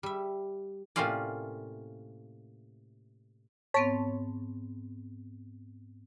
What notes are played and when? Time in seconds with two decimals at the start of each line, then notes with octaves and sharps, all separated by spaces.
0.03 G3 E5
0.96 A2 C3 A#3 C#4 F4 D5
3.74 G#2 B3 C4 C#5 A5